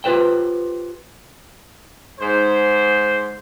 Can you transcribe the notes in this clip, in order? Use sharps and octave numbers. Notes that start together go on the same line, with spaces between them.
F4 G4 B4 C5 G5
G#2 C5